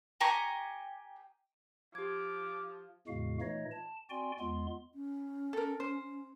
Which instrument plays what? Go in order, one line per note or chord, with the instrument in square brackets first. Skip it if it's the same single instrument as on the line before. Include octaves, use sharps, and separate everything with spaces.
[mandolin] G4 G#5 A#5 C#6
[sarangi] F3 [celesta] G4 G#6 [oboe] D6
[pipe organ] E2 A2 C#3 G#3 F#4 F5
A#2 E3 A3 D#4 C#5 D#5
A5
C4 F#4 D5 G5 G#5 C6
E2 G#3 B3 F4 C6
[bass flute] C#4
[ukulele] A4 A#4
C5